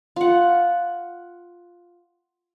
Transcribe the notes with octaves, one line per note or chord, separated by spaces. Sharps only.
F4 F#5